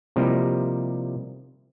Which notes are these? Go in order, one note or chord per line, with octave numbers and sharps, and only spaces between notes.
C3 F3 G3 A#3 D#4 E4